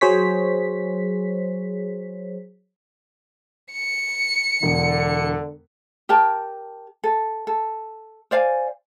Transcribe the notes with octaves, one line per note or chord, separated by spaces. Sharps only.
F#3 G#4 C5 C#5 B6
C#7
E1 D3
G4 A#4 A5
A4
A4
C5 D5 F5 G#5